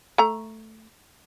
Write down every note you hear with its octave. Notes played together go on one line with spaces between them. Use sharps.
A3 A#5